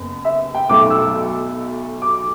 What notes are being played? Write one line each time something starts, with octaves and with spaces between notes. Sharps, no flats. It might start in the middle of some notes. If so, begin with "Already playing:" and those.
Already playing: F#1 B3
E5
G5
B1 B2 A3 D6
E6
D6